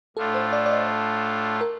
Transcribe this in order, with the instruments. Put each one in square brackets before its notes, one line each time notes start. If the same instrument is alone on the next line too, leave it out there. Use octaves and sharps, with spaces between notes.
[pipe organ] A2 A3 D4 F4 [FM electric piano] A4
[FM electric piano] C5
D5
D5
D#5
A#4